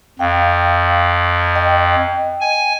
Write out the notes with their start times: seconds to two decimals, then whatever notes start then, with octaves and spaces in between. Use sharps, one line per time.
0.19 F2 F5 G5
1.55 D#5 G5
2.40 G#5